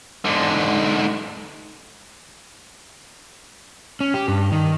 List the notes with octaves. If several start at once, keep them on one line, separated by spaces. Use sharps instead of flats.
G#2 D3
C#4
G4
G2
D#3